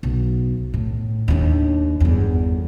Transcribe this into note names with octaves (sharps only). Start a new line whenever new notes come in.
B1
A2
D#2 D4
G1 E2